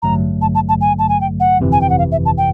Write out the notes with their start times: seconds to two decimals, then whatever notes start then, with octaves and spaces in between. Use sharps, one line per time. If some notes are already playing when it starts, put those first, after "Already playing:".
0.02 A1 G2 D3 F#3 A3 A#5
0.42 A5
0.55 A5
0.69 A5
0.81 G#5
0.99 A5
1.09 G#5
1.21 G5
1.40 F#5
1.60 G1 F2 C3 E3
1.72 G#5
1.81 G5
1.90 F#5
1.99 F5
2.12 E5
2.26 A5
2.38 G5